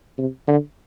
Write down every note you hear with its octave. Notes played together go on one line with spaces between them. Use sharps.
C3
D3